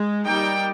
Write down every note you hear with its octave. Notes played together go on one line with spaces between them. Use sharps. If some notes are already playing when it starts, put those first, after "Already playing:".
Already playing: G#3
G3 A#3 D#4 G5